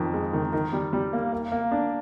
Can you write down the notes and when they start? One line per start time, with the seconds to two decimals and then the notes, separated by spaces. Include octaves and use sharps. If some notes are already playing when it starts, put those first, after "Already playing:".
Already playing: F2 D#3
0.14 G#3
0.33 D#3
0.53 D#3
0.73 G3
0.93 G3
1.13 A#3
1.33 A#3
1.52 A#3
1.72 D4